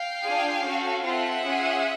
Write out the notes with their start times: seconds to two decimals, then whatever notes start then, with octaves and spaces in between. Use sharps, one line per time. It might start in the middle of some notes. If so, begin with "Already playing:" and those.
Already playing: F5 G5
0.23 D4 F4 G#4
0.63 C#4 F#4 A4
1.04 C4 F4 A4 E5 F#5
1.45 C#4 F4 G#4